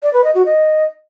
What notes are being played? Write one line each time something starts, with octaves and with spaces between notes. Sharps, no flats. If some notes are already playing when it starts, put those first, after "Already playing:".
D5
B4
D#5
F#4
D#5